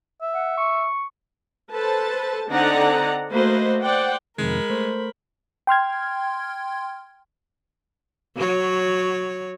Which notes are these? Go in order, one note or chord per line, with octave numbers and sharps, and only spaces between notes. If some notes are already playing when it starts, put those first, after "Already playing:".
E5
F#5
C#6
A4 B4 C5 A5
D3 C4 D#4 D5 F#5 A#5
A3 A#3 F#4 B4 C5 D#5
C5 D5 F#5 G5
F2 C3 D#3 G#3 A#4 B5
A3 C5
G5 C6 F6 G#6
F#3 C#5